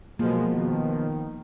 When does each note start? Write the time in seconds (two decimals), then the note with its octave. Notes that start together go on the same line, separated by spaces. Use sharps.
0.19 B2 F3 F#3 G#3 A#3
0.54 D#3